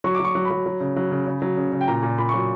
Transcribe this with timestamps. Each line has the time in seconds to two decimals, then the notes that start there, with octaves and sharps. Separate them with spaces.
0.04 F#3 C#6
0.15 D6
0.20 F#3 C#6
0.35 F#3
0.45 B5
0.50 F#3
0.66 F#3
0.80 C#3
0.96 F#3
1.11 C#3
1.27 C#3
1.42 F#3
1.57 C#3
1.73 C#3
1.81 G5
1.88 A#2 A#5
2.03 A#2
2.18 A#2 B5
2.29 F#3 C#6